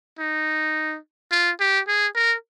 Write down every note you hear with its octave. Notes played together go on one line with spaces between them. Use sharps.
D#4
F4
G4
G#4
A#4